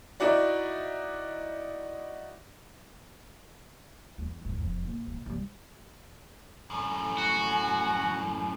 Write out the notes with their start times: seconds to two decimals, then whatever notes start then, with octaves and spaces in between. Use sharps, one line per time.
0.20 D#4 E4 F#4 D5
4.18 E2
4.41 G1 A2
4.57 E1 F2
4.85 A#2
5.07 A#2
5.26 G2 G3
6.70 F#2 A2 G#5
7.18 F#4